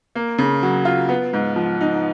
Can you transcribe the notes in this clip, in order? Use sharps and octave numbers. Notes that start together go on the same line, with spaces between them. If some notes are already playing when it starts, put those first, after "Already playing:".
A#3
C#3
F#3
F4
B3
G#2
F3
D#4